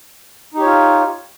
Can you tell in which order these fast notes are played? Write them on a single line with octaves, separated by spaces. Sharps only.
D#4 G4 C#5 F4